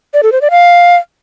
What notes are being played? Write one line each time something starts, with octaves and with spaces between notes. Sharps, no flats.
D5
A4
C5
D5
F5